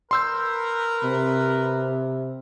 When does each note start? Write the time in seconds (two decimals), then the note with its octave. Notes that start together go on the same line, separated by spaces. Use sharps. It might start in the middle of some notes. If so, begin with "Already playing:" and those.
0.11 A#4 B4 C6 E6 G6
1.03 C3